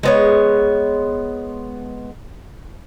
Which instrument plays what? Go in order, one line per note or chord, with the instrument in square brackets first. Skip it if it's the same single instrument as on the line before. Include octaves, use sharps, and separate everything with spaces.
[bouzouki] G#3 B3 C#5